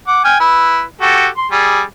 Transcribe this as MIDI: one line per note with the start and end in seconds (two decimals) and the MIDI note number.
0.07 0.21 78
0.07 0.21 86
0.25 0.37 79
0.25 0.37 80
0.25 0.37 89
0.40 0.81 64
0.40 0.81 71
1.01 1.27 66
1.01 1.27 67
1.01 1.27 69
1.37 1.48 84
1.51 1.81 55
1.51 1.81 68